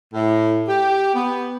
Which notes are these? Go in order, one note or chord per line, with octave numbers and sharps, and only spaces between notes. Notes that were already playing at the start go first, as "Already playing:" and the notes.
A2
G4
B3